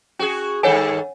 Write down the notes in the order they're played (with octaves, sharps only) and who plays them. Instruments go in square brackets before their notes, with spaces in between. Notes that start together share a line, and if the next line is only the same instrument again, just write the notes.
[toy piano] C#4 [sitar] F#4 G#4
[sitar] G2 D#3 A4 [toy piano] C#5 F#5 G#5